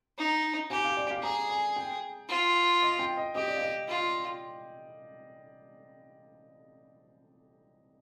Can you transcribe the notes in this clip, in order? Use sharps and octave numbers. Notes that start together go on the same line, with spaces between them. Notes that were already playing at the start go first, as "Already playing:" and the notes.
D#4
G4 G#5
F5
D5
F5
G#4 A#5
G#5
G5
F4
D#5
G5
D#5
G4 D#5
D5
F5
D#5
F4